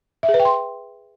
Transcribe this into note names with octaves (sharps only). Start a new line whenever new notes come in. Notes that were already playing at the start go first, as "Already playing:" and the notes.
E5
G#4
B4
G5
C6